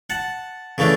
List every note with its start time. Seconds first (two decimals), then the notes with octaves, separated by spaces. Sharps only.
0.10 F#5 A5
0.78 C#3 E3 A3 D4